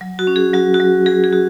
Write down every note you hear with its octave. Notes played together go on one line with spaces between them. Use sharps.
F#3
F#4
C#4
G#4
F#3 F#4
F#4
F#3
F#3 G#4
G#4
F#4